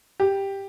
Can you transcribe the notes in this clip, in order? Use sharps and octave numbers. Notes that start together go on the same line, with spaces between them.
G4